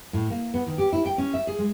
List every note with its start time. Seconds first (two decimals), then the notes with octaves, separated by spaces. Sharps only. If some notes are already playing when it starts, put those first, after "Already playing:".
0.13 A2
0.30 A#3
0.54 B3
0.66 D#3
0.78 G4
0.92 E4
1.06 G5
1.18 C#4
1.34 E5
1.47 G#4
1.59 G#3